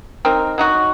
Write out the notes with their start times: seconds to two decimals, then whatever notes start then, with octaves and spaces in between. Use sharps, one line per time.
0.25 C4 D#4 A#4
0.58 F#3 D#4 F#4